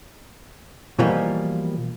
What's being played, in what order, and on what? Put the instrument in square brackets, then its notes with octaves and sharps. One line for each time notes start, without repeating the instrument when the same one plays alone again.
[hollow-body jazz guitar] B2 E3 F3 G3 A#3